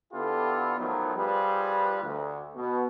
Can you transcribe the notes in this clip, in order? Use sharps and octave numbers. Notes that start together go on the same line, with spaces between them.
D3 B3 E4 F4 G4 A4
D#3 F3 F#3 A3 B3 D#4
F3 G3 F4 G#4 B4
D2
B2